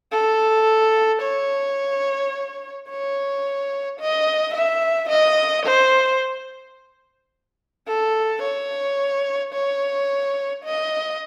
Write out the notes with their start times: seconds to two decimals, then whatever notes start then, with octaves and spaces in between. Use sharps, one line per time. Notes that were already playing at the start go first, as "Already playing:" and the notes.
0.12 A4
1.22 C#5
2.90 C#5
4.00 D#5
4.55 E5
5.10 D#5
5.66 C5
7.87 A4
8.42 C#5
9.54 C#5
10.65 D#5